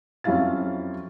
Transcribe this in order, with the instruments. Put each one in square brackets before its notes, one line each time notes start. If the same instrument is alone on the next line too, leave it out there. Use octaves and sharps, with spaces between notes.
[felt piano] F2 F#3 C#4 E4 F5 A6